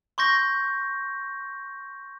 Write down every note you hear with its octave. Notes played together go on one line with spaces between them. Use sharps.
C6 C#6 G6 A#6